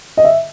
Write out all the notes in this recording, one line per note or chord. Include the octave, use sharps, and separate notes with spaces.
D#5
E5